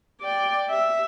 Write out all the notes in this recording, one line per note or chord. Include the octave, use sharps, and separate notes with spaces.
D5 G5
E5